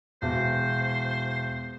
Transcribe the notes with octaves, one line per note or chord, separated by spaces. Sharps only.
E1 C5